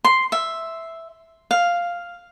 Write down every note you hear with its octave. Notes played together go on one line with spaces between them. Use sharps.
C6
E5
F5